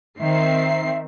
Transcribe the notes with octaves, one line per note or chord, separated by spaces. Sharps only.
D#3 C4 E5 C7